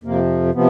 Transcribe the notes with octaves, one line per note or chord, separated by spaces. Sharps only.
F2 C3 F3 A#3
C3 F3 B3